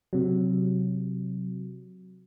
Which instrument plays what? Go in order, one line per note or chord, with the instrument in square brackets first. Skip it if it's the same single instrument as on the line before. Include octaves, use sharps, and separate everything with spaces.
[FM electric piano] C3 F#3